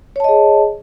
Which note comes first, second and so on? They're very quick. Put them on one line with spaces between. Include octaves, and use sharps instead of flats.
C#5 A5 D#5 G#4